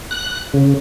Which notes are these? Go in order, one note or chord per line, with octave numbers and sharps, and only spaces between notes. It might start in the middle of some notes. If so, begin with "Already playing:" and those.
F#6
C#3